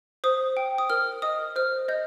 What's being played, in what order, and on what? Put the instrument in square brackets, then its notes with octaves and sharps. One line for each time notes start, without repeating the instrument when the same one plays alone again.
[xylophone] C5 D#6
G5
D#6
A#4 F6
D#5 D#6
C5 F6
D#5 G6